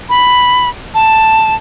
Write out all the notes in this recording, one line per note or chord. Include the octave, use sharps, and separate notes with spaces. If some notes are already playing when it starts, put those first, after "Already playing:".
B5
A5